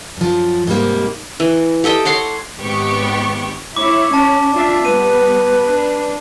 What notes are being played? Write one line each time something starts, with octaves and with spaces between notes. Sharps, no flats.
F#2 F3
G#2 C3 G3 A#3
E3
G4 A4 D#5 G5
C#5 F#5 C6 D6
G#1 G#2 B3 G4 C#6
E4 C#5 D6
C#4 A5
D4 F4 E5
G3 B3 B4 D#7
D4